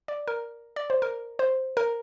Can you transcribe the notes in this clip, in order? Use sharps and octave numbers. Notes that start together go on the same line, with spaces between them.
D5
A#4
D5
C5
A#4
C5
A#4